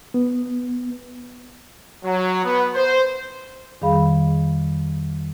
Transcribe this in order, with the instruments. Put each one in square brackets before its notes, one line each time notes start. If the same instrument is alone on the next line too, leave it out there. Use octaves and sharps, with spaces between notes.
[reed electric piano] B3
[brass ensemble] F#3
B3
C5
[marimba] F2 D#3 G3 G#4 F5 B5